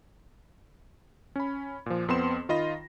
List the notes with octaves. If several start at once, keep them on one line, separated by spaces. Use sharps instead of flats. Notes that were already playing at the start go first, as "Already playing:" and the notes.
C#4 B5
A#2 F3
F2 B3 C4 C6 E7
D#3 F4 D#5 B5 A#6